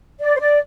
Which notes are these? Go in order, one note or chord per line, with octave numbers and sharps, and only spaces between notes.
D5
C5
D5